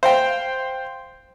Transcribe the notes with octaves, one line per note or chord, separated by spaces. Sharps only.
C5 F5 G5